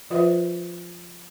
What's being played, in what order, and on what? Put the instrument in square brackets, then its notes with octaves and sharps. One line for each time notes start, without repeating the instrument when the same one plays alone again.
[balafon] F3 F4 B4 C5 E5